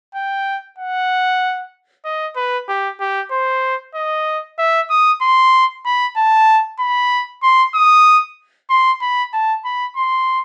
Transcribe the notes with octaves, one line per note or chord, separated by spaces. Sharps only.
G5
F#5
D#5
B4
G4
G4
C5
D#5
E5
D#6
C6
B5
A5
B5
C6
D#6
C6
B5
A5
B5
C6